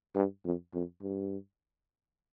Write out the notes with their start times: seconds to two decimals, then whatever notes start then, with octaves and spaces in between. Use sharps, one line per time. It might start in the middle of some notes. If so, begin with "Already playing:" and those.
0.16 G2
0.45 F2
0.74 F2
1.02 G2